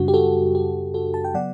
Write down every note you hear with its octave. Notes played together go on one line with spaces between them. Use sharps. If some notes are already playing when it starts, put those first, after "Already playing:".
Already playing: F#2 C#3 G3 D4 F#4
G4
F#4 A4
G4
F#4 A4
A5
G5
C#3 F#3 B3 D5 F#5